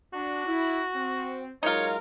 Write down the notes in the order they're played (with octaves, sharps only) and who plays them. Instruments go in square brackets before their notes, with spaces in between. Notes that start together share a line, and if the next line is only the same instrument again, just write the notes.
[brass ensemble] D4 [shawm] F#4
[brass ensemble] E4
C4
[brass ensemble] F#3 G#3 A#4 [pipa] D#4 F4 [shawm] C#5